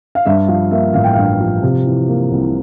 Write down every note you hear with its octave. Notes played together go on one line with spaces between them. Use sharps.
F5
G2 E5
F3 F5
A#3 E5
A1 F5
G5
G2 F5
F3
C3
E3
A#3
C2